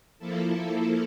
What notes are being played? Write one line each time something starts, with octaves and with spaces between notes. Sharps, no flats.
F3 A#3 E4 A4